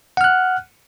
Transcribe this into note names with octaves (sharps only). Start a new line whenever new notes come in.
F#5 F6 F#6